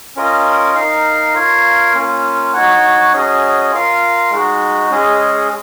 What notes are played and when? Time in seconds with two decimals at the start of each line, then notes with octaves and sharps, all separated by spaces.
0.16 C#4 F4 A#4 D#5
0.74 D#4 A#4 F5
1.34 F4 A#4 C#5 F5
1.93 A#3 C#4 F4
2.53 D#4 F#4 C#5 F#5
3.12 F#3 C#4 G#4 D#5
3.72 F4 A#4 F5
4.30 G#3 D#4 F#4
4.90 G#3 C#4 G#4 D#5